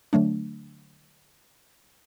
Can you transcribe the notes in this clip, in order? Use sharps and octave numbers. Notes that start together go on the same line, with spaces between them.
D3 F#3 A3 D4